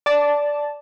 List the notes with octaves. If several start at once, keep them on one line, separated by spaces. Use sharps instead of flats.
D5 A5